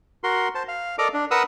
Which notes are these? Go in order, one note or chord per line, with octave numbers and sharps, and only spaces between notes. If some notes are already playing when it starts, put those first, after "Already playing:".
F#4 A#4 C6
C5 A5
F5
A4 A#4 D5 D#5 A#5 D6
D4
A#4 B4 F#5 D#6 E6 F#6